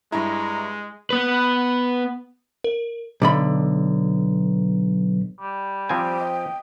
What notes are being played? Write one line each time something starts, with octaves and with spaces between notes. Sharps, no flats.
G2 G#3 E4 A#5
B3 B4
A#4
B1 D3 B5
G3
F3 C4 G5 G#5
D#5